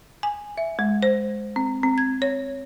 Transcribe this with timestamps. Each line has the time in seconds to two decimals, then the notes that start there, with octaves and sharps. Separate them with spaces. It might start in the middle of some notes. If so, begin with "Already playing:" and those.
0.23 G#5
0.58 E5
0.79 G#3
1.03 C5
1.56 C4
1.83 C4
1.98 G#6
2.22 C#5